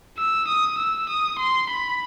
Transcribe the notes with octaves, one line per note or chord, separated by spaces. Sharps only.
E6
D#6
E6
D#6
C6
B5